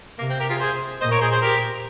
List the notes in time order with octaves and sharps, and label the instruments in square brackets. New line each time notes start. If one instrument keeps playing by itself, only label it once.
[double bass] C3 [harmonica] A#3
[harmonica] C4
G4 A#4
F4 G#4
G#4 C5
[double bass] A#2 [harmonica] C5 D#5
[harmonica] A#4 C#5
G#4 C5
G#4 C5
G4 A#4